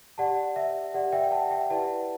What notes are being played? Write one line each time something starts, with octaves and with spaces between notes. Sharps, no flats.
G4 D5 F#5 A5
E5
G4 D5 F#5
E5 G5
G5
F#5 A5
E5 G5
E4 G4 B4 D5 F#5 A5